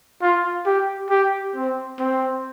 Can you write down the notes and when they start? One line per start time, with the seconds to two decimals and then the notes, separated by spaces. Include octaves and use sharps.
0.22 F4
0.66 G4
1.10 G4
1.55 C4
1.99 C4